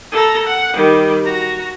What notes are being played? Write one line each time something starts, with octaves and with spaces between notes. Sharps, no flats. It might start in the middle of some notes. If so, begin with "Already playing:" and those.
A4 A#5
F#5
D#3 G3
F#4 A#5